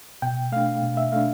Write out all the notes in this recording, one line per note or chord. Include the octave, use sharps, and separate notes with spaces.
B2 G5
A3 D4 F5
B2
E5
A3 D4 F5